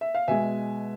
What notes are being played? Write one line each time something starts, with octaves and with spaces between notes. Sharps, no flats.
E5
F5
B2 G#3 E5 G#5